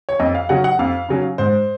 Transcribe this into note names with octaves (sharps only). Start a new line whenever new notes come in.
C#5
F2 D#5
F5
C#3 F#3 C#4 F#5
F#5
F2 F5
C#3 F#3 C#4
G#2 C5